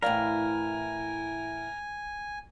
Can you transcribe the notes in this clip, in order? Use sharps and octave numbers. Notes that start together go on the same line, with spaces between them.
A2 E3 E4 A#4 D5 F5 G#5